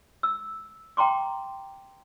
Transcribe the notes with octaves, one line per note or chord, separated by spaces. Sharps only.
E6
G5 A#5 C6 D6